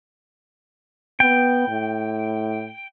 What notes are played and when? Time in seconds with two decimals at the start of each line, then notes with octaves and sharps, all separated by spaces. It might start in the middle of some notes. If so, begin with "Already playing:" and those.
1.20 B3 G5
1.69 A2